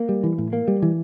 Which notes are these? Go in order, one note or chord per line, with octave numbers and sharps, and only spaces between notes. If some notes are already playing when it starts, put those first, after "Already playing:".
Already playing: A#3
G3
E3
A2
A#3
G3
E3